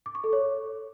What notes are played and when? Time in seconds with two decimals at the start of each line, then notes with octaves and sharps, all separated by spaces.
0.06 D6
0.15 C#6
0.24 A4
0.33 C#5